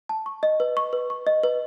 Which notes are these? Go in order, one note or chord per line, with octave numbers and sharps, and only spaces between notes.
A5
C#6
D#5
B4
C#6
B4
C#6
D#5
B4